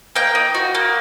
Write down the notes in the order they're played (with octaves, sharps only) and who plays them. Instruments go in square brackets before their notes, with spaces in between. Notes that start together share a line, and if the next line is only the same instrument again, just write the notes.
[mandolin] A#3 G5
D#4
F#4
A#3